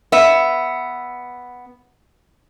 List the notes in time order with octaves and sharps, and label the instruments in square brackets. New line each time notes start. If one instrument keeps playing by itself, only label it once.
[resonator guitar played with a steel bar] B3 E5